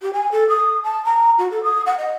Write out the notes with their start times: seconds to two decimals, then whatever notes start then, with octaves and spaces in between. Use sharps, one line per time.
0.02 G4
0.13 G#5
0.32 A4
0.49 D#6
0.84 A5
1.05 A#5
1.38 F#4
1.51 A4
1.63 D#6
1.86 F#5
1.98 D#5